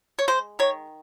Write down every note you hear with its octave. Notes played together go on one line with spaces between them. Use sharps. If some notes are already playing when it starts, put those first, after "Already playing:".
C#5
G#3 C5
D#3 C#5